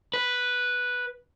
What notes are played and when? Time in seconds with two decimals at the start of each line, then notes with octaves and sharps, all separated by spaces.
0.14 B4